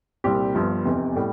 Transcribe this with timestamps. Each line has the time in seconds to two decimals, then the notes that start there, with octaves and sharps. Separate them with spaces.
0.24 C2 A#2 G3 C4 G4
0.55 G1 G2 F3
0.85 F1 E2 C3
1.16 A2 G3